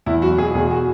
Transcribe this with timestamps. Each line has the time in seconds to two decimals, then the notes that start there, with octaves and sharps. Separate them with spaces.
0.06 E2 E4
0.22 F#3 F#4
0.38 B2 G#4
0.55 E2 G#4
0.71 F#4